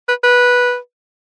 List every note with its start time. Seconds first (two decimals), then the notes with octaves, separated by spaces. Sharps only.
0.09 B4
0.24 B4